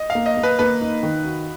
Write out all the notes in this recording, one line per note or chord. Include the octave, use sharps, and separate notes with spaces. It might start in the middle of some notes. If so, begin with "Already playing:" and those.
Already playing: D#5
F5
A#3
D#5
A#3
B4
A#3 B4
D#4
D#3
F#4